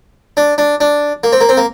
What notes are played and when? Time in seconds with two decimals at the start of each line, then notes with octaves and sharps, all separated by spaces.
0.37 D4
0.58 D4
0.81 D4
1.24 A#3
1.32 C4
1.41 A#3
1.49 C4
1.57 A#3